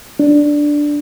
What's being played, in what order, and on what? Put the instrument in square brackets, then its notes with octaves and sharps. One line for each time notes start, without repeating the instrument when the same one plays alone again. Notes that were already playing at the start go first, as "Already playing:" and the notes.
[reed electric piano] D4